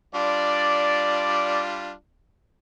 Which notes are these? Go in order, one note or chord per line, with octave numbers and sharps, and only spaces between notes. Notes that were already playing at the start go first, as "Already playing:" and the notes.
G3 D4 F4 D5